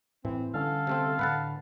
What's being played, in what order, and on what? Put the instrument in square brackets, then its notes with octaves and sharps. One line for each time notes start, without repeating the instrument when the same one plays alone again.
[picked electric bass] A2 [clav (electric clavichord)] E3 [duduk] C4
[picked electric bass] D3 G3 C#4 [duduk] A4 [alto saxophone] F5
[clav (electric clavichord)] C3 A3 C4
[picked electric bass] A2 D3 [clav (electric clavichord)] B4 F#5 A5